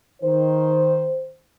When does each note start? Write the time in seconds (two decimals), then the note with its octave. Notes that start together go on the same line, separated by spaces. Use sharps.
0.22 D#3 C5